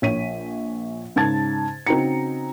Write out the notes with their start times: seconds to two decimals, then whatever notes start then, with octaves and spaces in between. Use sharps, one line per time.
0.02 A#1 C#5 B6 D#7
1.16 G#2 C#3 A5 G#6 A6
1.87 C#3 C4 D#4 F#4 A#5 C#7